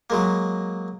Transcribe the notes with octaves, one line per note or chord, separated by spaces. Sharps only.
F#3 G#3 A#3